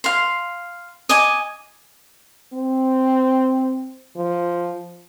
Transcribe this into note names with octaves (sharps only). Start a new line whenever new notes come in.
F5 C6
D#5 G#5 D6
C4
F3